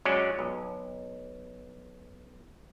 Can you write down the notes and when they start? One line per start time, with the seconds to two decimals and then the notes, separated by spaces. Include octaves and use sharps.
0.05 F#3 G#3 C#4 D4 C#5 D5
0.39 B1